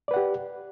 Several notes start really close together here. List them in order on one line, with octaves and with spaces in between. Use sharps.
D5 B4 F#5 G4